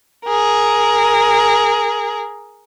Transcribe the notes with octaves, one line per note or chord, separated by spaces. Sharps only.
G#4 A#4